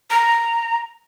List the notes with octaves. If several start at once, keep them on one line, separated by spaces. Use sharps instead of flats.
A#5